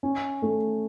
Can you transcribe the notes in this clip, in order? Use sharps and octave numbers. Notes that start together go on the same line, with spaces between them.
C#4
A3